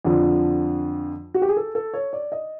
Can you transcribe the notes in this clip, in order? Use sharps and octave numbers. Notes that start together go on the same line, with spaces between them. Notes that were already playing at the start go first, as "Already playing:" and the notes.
F2 D3 F3
F#4
G4
G#4
A4
A4
C#5
D5
D#5